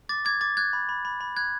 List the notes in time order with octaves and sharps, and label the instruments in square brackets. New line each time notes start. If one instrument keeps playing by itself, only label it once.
[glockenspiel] D6 A6
D6 G#6
D6 A6
F#6 G#6
B5
B5
B5
B5
F#6 G#6